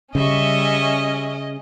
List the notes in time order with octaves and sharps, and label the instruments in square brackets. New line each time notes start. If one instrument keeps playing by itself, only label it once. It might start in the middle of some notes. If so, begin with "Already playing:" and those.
[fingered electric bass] C#3 [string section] G3 E5 C#6 [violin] C#4 D#5